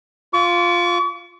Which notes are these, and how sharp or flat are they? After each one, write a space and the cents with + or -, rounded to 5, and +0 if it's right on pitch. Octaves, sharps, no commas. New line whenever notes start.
F4 +0 C#6 +45